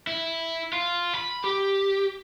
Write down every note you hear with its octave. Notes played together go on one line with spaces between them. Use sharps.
E4
F4
B5
G4